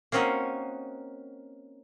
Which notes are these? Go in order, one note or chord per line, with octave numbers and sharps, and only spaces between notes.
A#3 C4 C#4 D#4 F#4